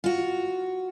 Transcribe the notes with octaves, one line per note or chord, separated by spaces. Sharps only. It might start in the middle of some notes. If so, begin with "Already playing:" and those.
F4 F#4